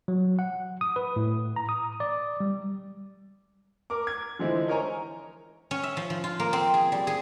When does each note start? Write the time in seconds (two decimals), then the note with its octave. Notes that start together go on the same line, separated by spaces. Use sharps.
0.08 F#3
0.39 F#5
0.81 D#6
0.96 B4
1.16 A2
1.56 A#5
1.69 D#6
2.00 D5
2.40 G3
3.90 A#4 D6
4.07 G#6
4.39 D3 E3 F3 G#3 C4 E4
4.67 D#4 A#4 C#5 G#5 A#5
5.71 C#4
5.83 E5
5.97 F3
6.10 F3
6.24 F4
6.40 A#3
6.53 C4
6.74 G#4
6.92 G3
7.07 G#4